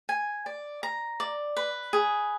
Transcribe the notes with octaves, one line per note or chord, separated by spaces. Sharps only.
G#5
D5
A#5
D5
B4
G#4